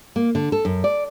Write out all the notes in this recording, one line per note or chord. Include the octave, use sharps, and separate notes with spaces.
A#3
D3
A4
F#2
D5